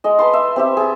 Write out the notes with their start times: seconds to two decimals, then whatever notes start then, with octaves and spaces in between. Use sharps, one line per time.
0.04 G#3 D#5
0.19 B4 A5 C6
0.33 E5
0.56 C4 G4 E5
0.77 G#4 A5